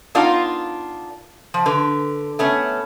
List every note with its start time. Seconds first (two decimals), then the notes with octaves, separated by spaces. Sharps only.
0.15 B3 D4 D#4 F4 A#4 D5
1.54 F3
1.66 D3 B4
2.39 A3 B3 C#4